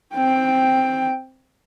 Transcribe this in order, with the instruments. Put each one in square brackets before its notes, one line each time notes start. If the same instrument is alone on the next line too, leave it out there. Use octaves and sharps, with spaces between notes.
[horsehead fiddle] C4 G5